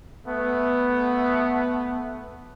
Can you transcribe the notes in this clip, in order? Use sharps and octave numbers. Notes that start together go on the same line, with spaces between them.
A3 B3